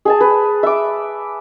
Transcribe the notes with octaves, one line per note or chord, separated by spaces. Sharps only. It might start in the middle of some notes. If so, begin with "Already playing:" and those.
G#4 G#5 A5
B4
E5 D6